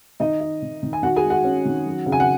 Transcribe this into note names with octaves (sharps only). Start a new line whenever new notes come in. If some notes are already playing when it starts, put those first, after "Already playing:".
D#3 D#4 D#5
D#4
D#3
D#3
G#5
D#3 F#4 F#5
G#4 G#5
G#3
F#4 F#5
C#4
D#3
F#3
C#3
G#5
F#5